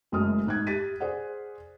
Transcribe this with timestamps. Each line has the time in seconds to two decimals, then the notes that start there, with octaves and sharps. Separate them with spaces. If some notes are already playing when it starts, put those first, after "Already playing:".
0.12 F#1 F#2 G#3 A3 D#6 F6
0.47 G#2 F#6 G#6
0.67 G4 A6 B6 D#7
1.00 G#4 C5 D5 F#5